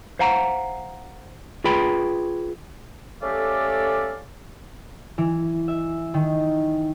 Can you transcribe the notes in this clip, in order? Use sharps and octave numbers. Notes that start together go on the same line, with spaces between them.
C5 F5 F#5 A#5
F4 G#4 B4 G5 B5
A3 C#4 G4 A4 D5 F5
E3
E5
D#3